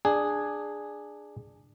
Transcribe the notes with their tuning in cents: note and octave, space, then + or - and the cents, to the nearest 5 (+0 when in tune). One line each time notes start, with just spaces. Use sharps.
D4 +10 G#4 +0